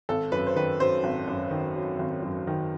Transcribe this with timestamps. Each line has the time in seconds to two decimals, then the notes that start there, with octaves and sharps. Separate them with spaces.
0.09 G#1 A4
0.32 F#2 B4
0.47 C5
0.56 D#3 B4
0.79 F#3 C5
1.04 G#1
1.28 F#2
1.51 D#3
1.75 F#3
1.99 G#1
2.22 F#2
2.47 D#3